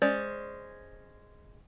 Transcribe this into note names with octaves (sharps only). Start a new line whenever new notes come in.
G#3 C#4 C5 D5